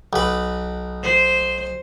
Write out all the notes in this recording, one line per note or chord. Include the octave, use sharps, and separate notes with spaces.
B1 B4
C5